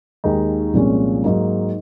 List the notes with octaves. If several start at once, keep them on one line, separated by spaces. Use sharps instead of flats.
D#2 D#3 G#3 D#4
C2 A#2 F3 G#3 C#4
G#2 F#3 A#3 D#4